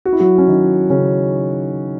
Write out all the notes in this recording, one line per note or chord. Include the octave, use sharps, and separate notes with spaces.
F#4
E4
F#3 F#4
C#4
D#3 D#4
C#3 C#4